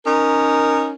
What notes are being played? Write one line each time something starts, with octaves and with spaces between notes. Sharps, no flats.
C#4 D#4 A#4